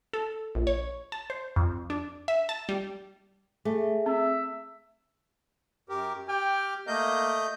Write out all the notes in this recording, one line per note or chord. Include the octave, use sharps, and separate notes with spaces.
A4
A#1
C#5
A5
C5
F2
D4
E5
A5
G3
A3 G#4
C4 E5
F#2 G4 A#4
G4 G5 F6
A3 A#3 D#5 G6